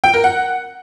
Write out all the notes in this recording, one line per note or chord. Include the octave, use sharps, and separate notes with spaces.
G5
A#4
F#5